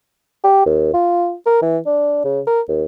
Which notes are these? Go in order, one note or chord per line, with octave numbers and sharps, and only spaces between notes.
G4
D#2
F4
A#4
E3
D4
C#3
A#4
D#2